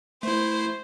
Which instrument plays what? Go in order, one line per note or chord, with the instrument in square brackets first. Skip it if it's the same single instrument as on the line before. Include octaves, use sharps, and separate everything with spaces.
[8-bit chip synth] A3 E4 [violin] C5